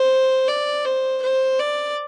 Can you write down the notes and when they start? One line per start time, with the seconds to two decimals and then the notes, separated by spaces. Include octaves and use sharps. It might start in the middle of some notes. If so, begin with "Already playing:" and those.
Already playing: C5
0.48 D5
0.85 C5
1.22 C5
1.60 D5